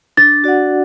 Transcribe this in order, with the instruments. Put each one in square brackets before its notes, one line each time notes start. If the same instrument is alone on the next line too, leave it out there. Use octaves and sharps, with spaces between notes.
[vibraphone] D4 [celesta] A6
[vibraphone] F#4 D5 F#5